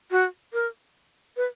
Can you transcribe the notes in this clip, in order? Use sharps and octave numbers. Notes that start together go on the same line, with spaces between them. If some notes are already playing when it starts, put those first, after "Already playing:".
F#4
A#4
B4